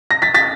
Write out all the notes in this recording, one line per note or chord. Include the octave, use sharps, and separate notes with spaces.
A#6
A6 B6
A6 B6